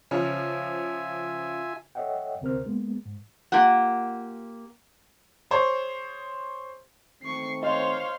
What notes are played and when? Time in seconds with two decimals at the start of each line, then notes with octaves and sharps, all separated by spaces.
0.11 C#3 F3 C#4 F4 E5 G#5
1.95 A4 C#5 D#5 E5 F#5 G5
2.41 D2 C3 C4 A#4 C5 F6
2.66 G#3 A#3 B3
3.06 G#2
3.52 A#3 F4 G4 F#5
5.51 G#4 C5 C#5
7.22 D#3 A3 C4 C#6 C7
7.63 C5 C#5 D#5 F5 C6